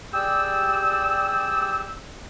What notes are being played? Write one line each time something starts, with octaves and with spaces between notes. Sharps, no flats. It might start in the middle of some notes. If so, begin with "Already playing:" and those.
G3 G4 G#4 D5 G5 E6